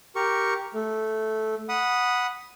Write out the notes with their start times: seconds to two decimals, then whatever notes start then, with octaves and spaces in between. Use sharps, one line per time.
0.16 G4 A#4 C#6
0.74 A3
1.69 F#5 B5 D#6